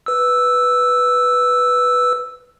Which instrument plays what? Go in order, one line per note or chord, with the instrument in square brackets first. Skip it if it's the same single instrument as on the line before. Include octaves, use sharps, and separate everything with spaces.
[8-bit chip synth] B4 E6